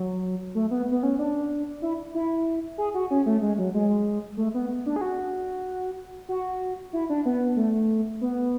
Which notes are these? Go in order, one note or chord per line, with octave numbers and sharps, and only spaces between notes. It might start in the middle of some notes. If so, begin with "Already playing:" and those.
Already playing: F#3
A3
B3
B3
C#4
D4
E4
E4
G#4
F#4
C#4
A3
G#3
F#3
G#3
A3
B3
D4
G#4
F#4
F#4
E4
D4
B3
A3
B3